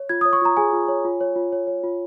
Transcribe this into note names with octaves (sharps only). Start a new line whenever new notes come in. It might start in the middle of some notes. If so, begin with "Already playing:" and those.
Already playing: C#5
F4 G#6
C#5 D#6
C#6
F4 A#5
G#4 G#5
F4
C#5
F4
C#5
F4
C#5
C#5
F4